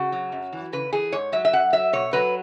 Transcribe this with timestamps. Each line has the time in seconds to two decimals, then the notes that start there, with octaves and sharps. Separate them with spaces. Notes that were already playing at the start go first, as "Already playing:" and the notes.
Already playing: C#3 F#4
0.12 F#3
0.32 F#2
0.53 E3
0.73 C#3 B4
0.93 E3 G#4
1.13 G#2 C#5
1.32 F#3 E5
1.45 E5
1.53 F#2 F#5
1.73 F#3 E5
1.93 B2 C#5
2.13 F#3 B4